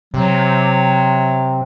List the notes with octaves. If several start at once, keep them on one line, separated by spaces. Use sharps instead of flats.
C3 F#3